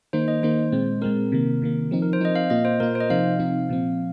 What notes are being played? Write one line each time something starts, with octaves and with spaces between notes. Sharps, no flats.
D#3 A#3 D#4 C5
D#5
D#3 A#3 D#4 C5
A#2 G#3 C4
A#2 G#3 C4 A#4
C3 D#3 A#3
C3 D#3 A#3
F3 C4 D#4
A#4
C5
F3 C4 D#4 D#5
F5
A#2 A#3 F4 D#5
C5
A#2 A#3 F4 A#4
C5
D#5
C3 F3 C4 D#4 F5
C3 F3 C4 D#4
A#2 F3 C4